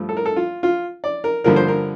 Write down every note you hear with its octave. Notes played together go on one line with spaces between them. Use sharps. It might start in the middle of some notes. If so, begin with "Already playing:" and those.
Already playing: G2 F3 A3
A4
A#4
A4
F4
F4
D5
A#4
G2 D3 F3 A#3 A#4
C5
A#4